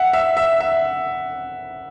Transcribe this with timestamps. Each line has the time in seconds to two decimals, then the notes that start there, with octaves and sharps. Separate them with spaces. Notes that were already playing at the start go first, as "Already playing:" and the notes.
Already playing: E5 F#5
0.13 E5
0.37 E5
0.60 E5